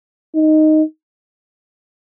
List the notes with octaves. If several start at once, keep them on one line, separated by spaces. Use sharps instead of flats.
D#4